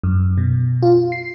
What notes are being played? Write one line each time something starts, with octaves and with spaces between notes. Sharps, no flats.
F#2
B2
F4
C7